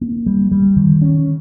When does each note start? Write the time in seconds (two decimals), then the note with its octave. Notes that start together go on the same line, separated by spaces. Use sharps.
0.01 A#3
0.26 G3
0.52 G3
0.76 D#3
1.02 C#4